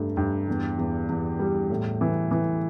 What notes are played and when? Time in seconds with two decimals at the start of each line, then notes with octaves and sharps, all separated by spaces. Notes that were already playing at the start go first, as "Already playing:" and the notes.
Already playing: G2 A3
0.17 G2
0.48 E2
0.78 E2
1.09 E2
1.39 G3
1.70 A2
2.01 E3
2.31 E3